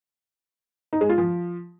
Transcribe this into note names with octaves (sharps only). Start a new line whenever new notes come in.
D#4
G#3
F4
F3